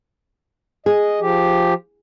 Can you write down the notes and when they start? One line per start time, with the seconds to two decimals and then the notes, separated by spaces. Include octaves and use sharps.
0.86 G#4 D#5
1.20 F3 G4